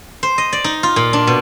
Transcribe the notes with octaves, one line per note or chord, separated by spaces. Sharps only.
C5
D#5
D5
D#4
F4
A#2
D4
B2